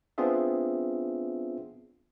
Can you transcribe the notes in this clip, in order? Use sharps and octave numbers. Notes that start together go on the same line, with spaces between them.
B3 C4 D4 F4 G#4 E5